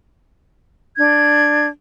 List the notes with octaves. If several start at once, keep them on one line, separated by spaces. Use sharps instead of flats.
D4 G#6